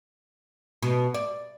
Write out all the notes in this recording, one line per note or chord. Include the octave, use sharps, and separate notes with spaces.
B2
D5